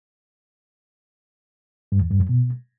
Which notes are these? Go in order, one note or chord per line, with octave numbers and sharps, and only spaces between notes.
G2
E2
G2
F#2
B2